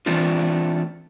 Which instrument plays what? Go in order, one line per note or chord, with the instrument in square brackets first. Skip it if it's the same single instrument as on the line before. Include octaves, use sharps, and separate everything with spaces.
[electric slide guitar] E3 A3 C4 D4 F4